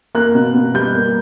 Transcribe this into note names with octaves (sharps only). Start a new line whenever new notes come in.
A#3 F#6
B2
B2
G3 G6
A#3